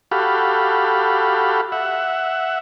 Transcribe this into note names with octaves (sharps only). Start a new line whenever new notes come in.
F#4 G4 A4 F5 B5
E5 F#5